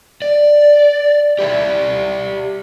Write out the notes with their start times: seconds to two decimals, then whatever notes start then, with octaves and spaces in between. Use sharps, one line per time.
0.22 D5
1.39 G4 D5 E5